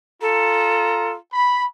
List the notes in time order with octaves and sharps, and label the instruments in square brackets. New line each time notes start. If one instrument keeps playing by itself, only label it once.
[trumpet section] F4 A#5 [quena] A4
[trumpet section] B5